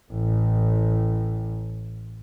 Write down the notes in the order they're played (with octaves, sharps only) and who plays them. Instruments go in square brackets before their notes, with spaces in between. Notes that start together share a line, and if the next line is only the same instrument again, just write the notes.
[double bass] A1 A2